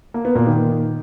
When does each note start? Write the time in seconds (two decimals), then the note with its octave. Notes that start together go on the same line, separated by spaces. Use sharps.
0.14 A#3
0.25 B3
0.35 A#2 A#3
0.47 D#3